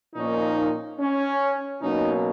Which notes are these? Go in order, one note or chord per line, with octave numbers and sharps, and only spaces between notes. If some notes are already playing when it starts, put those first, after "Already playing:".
A#2 F3 A#3 C#4 D#4
C#4
B2 F#3 A#3 C#4 D#4